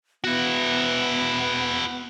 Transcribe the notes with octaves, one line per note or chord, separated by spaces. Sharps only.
B3 E4 F#4